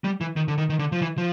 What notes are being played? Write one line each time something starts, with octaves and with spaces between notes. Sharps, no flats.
G3
E3
D#3
D3
D#3
D#3
D3
F3
E3
F3